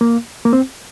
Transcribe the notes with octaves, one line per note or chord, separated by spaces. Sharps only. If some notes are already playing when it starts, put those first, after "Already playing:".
A#3
A#3
C4